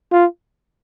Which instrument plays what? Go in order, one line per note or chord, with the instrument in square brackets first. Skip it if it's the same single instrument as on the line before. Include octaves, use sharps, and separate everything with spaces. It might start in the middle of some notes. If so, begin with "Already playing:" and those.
[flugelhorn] F4